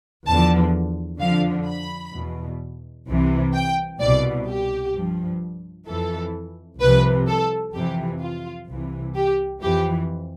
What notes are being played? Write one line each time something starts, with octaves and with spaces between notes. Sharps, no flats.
E2 D3 F3 A5
F2 D3 F3 F5
B5
E2 B2
C2 C3 E3
G5
C2 B2 D5
G4
G2 F3
F2 E3 A4
C2 C3 F3 B4
A4
F2 C3 E3 G4
F4
C2 C3 E3
G4
F2 E3 G4